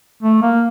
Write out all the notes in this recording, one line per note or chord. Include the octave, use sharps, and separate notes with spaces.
A3
A#3